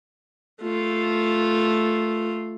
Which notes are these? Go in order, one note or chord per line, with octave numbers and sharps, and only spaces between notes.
A3 F4